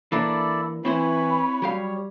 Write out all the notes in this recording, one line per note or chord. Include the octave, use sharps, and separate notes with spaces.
E3 A#3 D4 E4 A4 D5
E3 C4 E4 C5 C#5 B5
F#3 G3 G4 F5